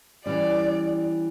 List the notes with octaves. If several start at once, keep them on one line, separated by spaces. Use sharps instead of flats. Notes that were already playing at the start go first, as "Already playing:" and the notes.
E3 G3 C#4 D5